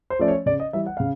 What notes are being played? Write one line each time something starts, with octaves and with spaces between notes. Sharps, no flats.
C5
F3 A3 C#4 D5
C#5
C#3 D5
D#5
E3 G3 E5
F#5
C#3 F5